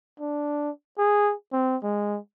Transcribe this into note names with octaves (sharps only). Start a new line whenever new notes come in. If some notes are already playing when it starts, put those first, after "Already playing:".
D4
G#4
C4
G#3